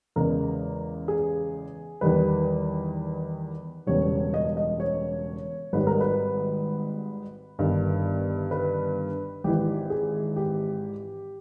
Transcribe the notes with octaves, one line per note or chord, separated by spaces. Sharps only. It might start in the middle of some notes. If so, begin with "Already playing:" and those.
E2 C#3 G#3 A#4
G#4
E2 D#3 G3 B4
E1 E2 C#3 G3 C#5
D#5
D#5
C#5
G#1 G#2 G3 B4
A#4
B4
G1 G2 D#3
B4
G#1 G#2 E3 G4
G#4
G4